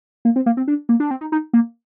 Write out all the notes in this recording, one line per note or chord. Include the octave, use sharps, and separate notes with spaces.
A#3
C4
A#3
C4
D4
A#3
D4
C4
D#4
D#4
A#3